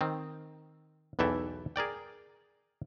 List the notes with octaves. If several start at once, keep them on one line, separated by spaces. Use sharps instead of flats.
D#3 C4
B1 E2 E3 A4 E5 G5
G#4 A#4 D5 G5